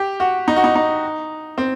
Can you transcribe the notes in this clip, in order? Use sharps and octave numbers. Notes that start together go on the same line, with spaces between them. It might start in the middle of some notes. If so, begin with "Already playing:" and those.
Already playing: G4
F#4
D#4
F#4
D#4
D#4
C4